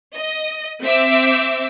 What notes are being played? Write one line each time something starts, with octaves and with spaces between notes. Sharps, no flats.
D#5
C4 E5 D6 E6